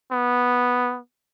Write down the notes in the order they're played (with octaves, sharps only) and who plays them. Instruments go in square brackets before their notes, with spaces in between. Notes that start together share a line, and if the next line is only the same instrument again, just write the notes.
[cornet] B3